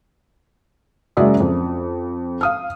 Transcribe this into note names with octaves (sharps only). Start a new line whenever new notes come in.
F#1 G#3 F#4 D5 E5 D#6
F2
F5 D#6 F6